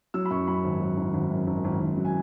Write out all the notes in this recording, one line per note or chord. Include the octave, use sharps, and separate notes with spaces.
F#3 E6
B5
F#2 C#6
F#2 B5
G#1
F#3
G#1
G#1
F#2
G#1
G#1
G#1
F#3
G#5